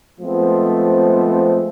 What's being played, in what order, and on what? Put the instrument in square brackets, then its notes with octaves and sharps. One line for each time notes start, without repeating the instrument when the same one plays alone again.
[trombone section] F3 G#3 A3 B3 C4